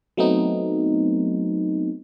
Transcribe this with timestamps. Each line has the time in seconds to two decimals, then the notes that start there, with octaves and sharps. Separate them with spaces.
0.17 F#3 A3 B3 C4 D#4